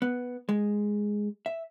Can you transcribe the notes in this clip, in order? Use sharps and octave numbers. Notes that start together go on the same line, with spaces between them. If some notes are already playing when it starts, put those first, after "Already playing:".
B3
G#3
E5